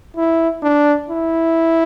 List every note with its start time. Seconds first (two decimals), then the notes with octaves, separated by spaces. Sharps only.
0.17 E4
0.62 D4
1.08 E4